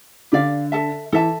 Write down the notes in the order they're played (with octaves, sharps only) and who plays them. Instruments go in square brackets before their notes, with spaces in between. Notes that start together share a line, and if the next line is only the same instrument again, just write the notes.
[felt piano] D3 [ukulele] G4 D5 F5
[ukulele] A4 E5 A5
[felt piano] E3 [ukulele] A4 E5 A5